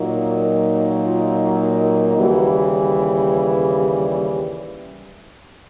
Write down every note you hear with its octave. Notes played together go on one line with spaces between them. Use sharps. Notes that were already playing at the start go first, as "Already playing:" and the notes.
Already playing: A#2 F#3 A#3 D#4
F4
D#2 C#3 E3 G3 F#4